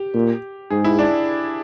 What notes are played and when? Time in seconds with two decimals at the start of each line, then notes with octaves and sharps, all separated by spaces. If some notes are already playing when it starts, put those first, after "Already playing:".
Already playing: G4
0.14 A#2
0.70 G#2 G#4
0.84 E4
0.99 D4